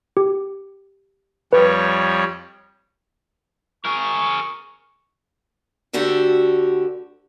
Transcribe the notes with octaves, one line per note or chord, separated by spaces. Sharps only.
G4
F2 G3 B4 C#5
G#4 A#4 C#6
D2 D3 F#4 G4 A4